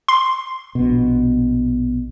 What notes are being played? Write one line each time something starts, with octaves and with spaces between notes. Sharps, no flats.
C6
A#1 B2